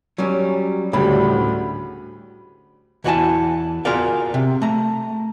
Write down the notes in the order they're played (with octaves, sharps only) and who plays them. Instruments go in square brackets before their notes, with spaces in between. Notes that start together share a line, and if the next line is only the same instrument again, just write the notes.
[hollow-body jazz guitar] F#3 G3 C#4
[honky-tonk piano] D2 B5 [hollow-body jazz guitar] A2 C#3 G3
[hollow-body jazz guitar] E2 E3 F#4 C#5 G#5 A5
F4 F#4 G#4 A#4 D5 F5
C3
A3 A#5